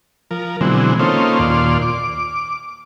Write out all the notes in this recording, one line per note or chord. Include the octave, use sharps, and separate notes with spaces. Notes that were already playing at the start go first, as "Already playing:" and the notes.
F3 A#4
B2 D3 E3 F#3 G#3 C4
A#3 C#4 D#4 F4 A4 C5
D#2 A#2 F4 D5 C6
D6